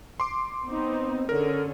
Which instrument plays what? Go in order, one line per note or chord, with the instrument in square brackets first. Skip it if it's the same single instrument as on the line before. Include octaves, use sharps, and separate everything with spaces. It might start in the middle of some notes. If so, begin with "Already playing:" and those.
[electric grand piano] C6 D6
[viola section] B3 C4 D#4
[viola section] D3 C#4 G#4 [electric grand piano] A#4